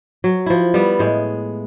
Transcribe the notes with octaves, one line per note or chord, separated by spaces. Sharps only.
F#3
F3 E4
G3 B3
A2 G#3